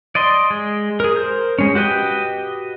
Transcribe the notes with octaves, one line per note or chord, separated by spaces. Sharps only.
D5 D#5 C6
G#3
G#4 A#4
A#4 C5
G#3 C#4
F#4 G4 B4 D#5 G5